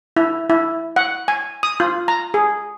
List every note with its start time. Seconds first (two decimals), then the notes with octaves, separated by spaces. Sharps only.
0.16 E4
0.50 E4
0.96 F#5
1.28 G#5
1.63 D#6
1.80 F4
2.08 A#5
2.34 G#4